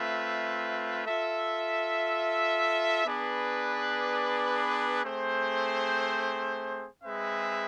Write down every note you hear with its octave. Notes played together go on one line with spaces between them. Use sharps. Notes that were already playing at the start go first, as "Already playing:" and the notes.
Already playing: A3 C4 F4 B4 E5
F4 A4 E5
B3 D4 G#4 B4 D5
A3 C4 G#4 C5
G#3 C4 G#4 B4 E5